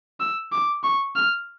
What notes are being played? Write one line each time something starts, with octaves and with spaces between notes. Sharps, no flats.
E6
D6
C#6
F6